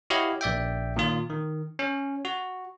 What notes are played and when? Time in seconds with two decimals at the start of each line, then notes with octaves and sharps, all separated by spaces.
0.10 E4 F#4 G4 C#5 D#5 F5
0.41 A#1 D5 E5 G5
0.96 A#2 D#3 F4
1.30 D#3
1.79 C#4
2.25 F#4